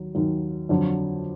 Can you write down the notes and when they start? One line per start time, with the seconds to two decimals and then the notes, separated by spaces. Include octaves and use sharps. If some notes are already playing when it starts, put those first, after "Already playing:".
Already playing: D#2 F#3
0.15 D#2 D#3 F#3
0.69 F2 D3 F#3